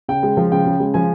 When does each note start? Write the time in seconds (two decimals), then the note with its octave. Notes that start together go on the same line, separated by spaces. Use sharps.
0.09 C#3 G5
0.23 G#3
0.37 F3
0.52 C#3 G5
0.66 C#3
0.80 G#3
0.94 F3 G#5